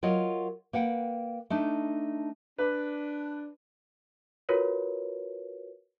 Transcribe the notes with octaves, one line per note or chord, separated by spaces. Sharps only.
F#3 F4 A#4 C#5 D#5
A#3 B4 F#5 G5
A3 D4 D#4
D4 B4
F4 F#4 A#4 B4 C#5